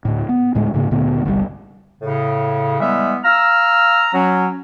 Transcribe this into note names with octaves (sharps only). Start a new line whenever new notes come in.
D2 A2
B3
D2 A2 G#3
G#2 C#3 A#3
D2 A#2 D3 B3
G1 C2 C3 G3
A2 C#3
E3 G3 G#3 B3 E5
F5 A#5 E6 F6
F#3 C#4